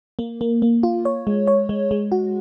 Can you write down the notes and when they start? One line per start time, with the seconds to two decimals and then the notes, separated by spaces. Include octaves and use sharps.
0.19 A#3
0.41 A#3
0.62 A#3
0.83 F4
1.05 C#5
1.27 G#3
1.48 C#5
1.69 G#3
1.91 G#3
2.12 F#4